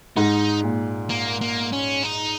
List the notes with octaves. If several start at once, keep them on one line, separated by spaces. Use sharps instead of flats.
G#2 D#4
A#2
A#3
A#3
C#4
D#4